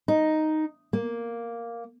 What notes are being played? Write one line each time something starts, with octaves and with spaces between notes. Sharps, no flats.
D#4
A#3